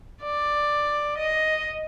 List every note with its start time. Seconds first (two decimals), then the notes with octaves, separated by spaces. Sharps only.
0.23 D5
1.18 D#5